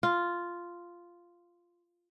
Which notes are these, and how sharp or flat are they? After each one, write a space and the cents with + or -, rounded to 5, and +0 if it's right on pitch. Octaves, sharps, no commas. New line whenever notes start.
F4 -5